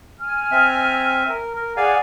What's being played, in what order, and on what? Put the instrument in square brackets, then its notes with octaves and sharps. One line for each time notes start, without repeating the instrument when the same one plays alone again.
[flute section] G#5 F6
[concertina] C4 E5
A#4
A#4
[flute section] G#4 F#5 [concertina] D5 F5 G#5